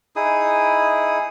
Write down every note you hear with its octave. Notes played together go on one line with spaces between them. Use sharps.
D#4 E4 G#4 D#6